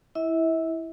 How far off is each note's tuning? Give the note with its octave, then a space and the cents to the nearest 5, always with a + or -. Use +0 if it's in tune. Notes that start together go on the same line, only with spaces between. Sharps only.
E4 -5 E5 -35